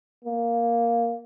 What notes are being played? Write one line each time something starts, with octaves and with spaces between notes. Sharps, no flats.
A#3